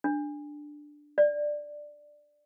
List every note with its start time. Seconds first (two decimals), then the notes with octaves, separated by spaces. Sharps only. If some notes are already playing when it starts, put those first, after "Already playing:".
0.04 D4
1.18 D5